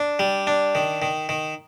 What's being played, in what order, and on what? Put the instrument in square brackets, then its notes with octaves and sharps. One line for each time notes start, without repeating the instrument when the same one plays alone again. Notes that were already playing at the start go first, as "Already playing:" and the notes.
Already playing: [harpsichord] D4
G3
D4
D#3
D#3
D#3